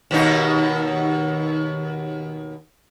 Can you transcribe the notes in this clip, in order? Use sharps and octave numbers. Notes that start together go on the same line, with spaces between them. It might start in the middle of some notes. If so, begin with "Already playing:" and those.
D#2 B2 D#4